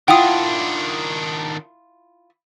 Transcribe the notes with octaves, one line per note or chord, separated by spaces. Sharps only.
D#3 D4 E4 F4 F#5 G5 D#6